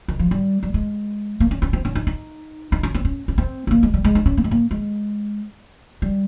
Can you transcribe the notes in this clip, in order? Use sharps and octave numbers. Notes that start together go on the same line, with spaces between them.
D#3
F3
G3
G3
G#3
A#3
C#4
C#4
C4
C#4
D#4
D#4
D#4
C#4
C4
C#4
C#4
C4
C4
A#3
G#3
G3
G#3
D#4
C#4
A#3
G#3
A#3
G#3
G3